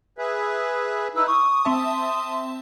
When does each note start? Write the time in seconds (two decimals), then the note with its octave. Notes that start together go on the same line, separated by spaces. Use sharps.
0.18 G#4 B4 E5
1.16 D#4 E4 B4 E6
1.27 C#6 D#6
1.65 C4 E5 A5 C6